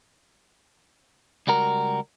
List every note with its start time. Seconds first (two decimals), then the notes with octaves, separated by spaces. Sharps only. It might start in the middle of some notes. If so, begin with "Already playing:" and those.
1.47 C#2 G3 F#4 A#4